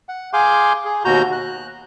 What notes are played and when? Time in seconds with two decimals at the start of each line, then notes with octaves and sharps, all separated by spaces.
0.09 F#5
0.33 G#4 F5 G#5 C6 D6 G6
0.85 G#4
1.05 D#2 B2 F#4 A#5 G6
1.32 F#6